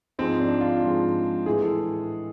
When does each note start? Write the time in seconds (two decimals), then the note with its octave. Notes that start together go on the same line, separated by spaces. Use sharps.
0.19 G#2 F3 G#3 C4
0.40 D4
0.61 F4
0.82 G#2 F3 G#3
1.46 A2 E3 G#3 G#4
1.62 A4